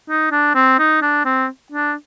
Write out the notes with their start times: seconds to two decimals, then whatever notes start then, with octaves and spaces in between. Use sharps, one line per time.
0.09 D#4
0.32 D4
0.55 C4
0.79 D#4
1.02 D4
1.25 C4
1.72 D4